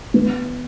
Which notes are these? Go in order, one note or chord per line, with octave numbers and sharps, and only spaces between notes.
B3